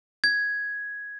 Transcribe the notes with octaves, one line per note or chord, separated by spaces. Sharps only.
G#6